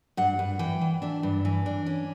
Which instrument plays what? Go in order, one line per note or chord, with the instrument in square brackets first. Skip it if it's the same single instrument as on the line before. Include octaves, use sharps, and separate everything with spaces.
[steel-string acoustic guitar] G2 F#5
G2
E3 G5
E3
D4 E5
G2
E3
D4
C#4